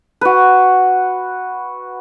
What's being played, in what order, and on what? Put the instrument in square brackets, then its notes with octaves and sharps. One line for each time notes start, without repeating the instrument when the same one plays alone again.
[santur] F#4 B4